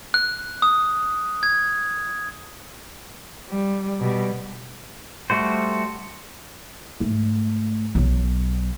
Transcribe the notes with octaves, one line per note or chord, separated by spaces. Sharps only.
F#6
D#6
G#6
G3
B2 G3
G3 A3 F#4 C5
G#2 A3
B1 F#3